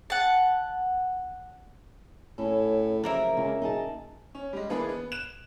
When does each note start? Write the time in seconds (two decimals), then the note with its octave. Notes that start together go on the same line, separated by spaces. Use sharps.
0.10 F#5 A5
2.38 A2 C#4 A4
3.04 F#1 F3 A#3 A#4 E5
3.37 C#2 C#3
3.62 F#1 D#4 G#4 A5
4.35 C#4
4.53 G3 G#3
4.70 E3 A#3 B3 D4 G#4 B4
4.89 B3
5.12 F#6 E7